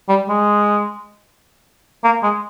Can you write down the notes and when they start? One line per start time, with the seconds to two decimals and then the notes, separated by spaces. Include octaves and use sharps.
0.09 G3
0.29 G#3
2.04 A#3
2.23 G#3